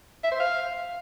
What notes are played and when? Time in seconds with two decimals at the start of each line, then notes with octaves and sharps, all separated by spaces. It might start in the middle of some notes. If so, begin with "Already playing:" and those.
0.24 E5
0.32 C5
0.40 F5